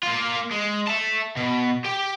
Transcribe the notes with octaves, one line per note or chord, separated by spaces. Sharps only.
A#3 F4
G#3
E5 A5
B2
G4 G5